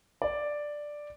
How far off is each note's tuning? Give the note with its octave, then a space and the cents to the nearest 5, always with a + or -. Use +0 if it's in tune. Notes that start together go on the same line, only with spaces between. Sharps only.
D5 +5